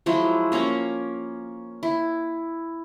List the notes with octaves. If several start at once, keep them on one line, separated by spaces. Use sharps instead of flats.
F3 F#3 G#3 E4
A#3 C#4 F5 A#5
E4